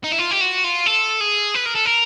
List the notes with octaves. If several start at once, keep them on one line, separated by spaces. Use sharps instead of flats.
D#4
E4
F4
G4
F#4
F4
A4
G#4
B4
A#4
A4
A#4